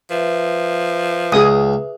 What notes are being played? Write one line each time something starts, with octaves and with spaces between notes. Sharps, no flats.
F3 B4 E5
C#2 G#4 D#6